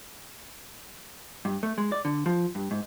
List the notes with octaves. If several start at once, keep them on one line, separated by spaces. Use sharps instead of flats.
G2
A3
G#3
D5
D3
F3
G2
G#2